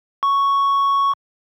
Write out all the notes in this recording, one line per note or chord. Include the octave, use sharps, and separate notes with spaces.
C#6